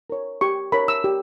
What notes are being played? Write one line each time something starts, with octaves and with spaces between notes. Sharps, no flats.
A#4 C#5
G4 C#6
A#4 C#5 B5
E6
G4